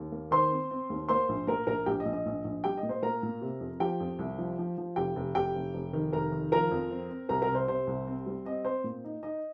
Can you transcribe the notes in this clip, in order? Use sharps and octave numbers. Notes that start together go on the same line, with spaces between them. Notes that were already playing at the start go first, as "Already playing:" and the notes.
Already playing: D#2
A#3
D#3 C5 C6
C4
C4
D#2
A#3 C5 C6
A#1
A#2 A#4 A#5
A#1 A#4 A#5
A#1 G4 G5
D#5
A#1
D#5
A#1
A#1
G3 G4 G5
D#5
A#2
C5
A#2 A#4 A#5
A#2
C3
F2
F3 G4 G5
F2
C2
F3
F3
F3
F1 G4 G5
F1
F1 G4 G5
F1
F1
D#3
F1 A#4 A#5
D#3
F3 A#4 A#5
F2
C4
C4
C2 A#4 A#5
A#4 A#5
C3
C5
C3 C5
C2
C4
G3
C4 D#5
C4 C5
A#2
D#4
D#4 D#5